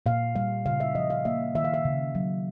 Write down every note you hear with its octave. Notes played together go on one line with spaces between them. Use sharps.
A#2 F5
G3 F5
C#3 F5
E5
F3 D#5
F5
A#3 E5
D#3 E5
F5
E5
C#3
F#3